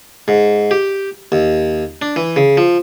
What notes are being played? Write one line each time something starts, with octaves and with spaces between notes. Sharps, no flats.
G#2
G4
D#2
D4
E3
C#3
F3